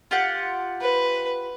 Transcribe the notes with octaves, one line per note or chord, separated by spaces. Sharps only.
F4 G4 F#5
B4